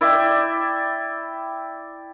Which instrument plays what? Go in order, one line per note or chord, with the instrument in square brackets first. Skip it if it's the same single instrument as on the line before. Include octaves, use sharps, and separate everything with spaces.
[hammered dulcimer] E4 D5 E5 G5